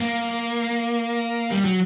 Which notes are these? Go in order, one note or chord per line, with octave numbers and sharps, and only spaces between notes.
A#3
G3
F#3